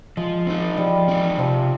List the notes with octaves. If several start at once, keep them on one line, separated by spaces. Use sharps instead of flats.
F3 G#3
C4 D#4
F3 G3
C4 D#4
C3 F3